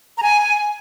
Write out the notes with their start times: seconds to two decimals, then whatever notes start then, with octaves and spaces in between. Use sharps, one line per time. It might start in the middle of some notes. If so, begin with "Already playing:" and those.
0.18 A#5
0.23 G#5